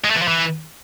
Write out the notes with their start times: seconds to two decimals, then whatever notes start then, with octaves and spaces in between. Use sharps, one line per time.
0.05 G#3
0.10 A3
0.16 E3
0.22 F3
0.28 E3